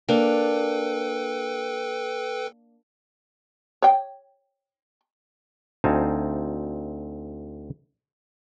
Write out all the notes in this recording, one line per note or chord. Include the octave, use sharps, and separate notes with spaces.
A#3 D4 A4 B4 G5
C#5 G5
D2 C4 D#4 F5 G#5 A5